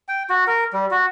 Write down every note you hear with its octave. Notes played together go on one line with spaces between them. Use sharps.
G5
F#4
A#4
G3
F#4